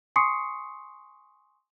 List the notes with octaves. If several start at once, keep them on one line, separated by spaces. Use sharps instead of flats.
G#5 C6 C#6 D#6 C7 C#7